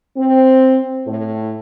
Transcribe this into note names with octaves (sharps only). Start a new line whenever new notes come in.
C4
A2